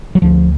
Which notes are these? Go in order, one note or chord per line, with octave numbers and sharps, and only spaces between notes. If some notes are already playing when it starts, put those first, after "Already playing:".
F#3
D2 D3 F3